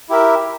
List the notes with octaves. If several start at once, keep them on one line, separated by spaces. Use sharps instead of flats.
E4 G4 A#4 E5